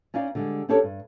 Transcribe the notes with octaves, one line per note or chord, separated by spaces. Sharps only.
C#4 D#4 D5 F5
D3 G3 G#3
C#4 D4 G4 A4 A#4 C#5
G2